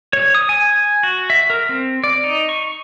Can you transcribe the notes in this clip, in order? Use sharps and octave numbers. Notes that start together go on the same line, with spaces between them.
C#5
D#6
G#5
G#5
F#4
E5
A#4
C4
D5
D#4
C#6